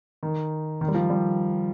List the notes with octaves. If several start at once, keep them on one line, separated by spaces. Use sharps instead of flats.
D#3
D#3
G3
F3
G3